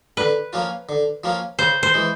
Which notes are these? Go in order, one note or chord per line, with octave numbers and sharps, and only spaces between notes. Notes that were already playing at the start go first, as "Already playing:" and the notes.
D3 B4
F3 A#3 C#4 F4
D3
F3 A#3 C#4 F4
C#3 C5
C5
E3 G#3